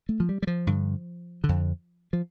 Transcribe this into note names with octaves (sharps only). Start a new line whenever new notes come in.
A3
F3
G3
G3
F3
G2 D3
D3
F2
F3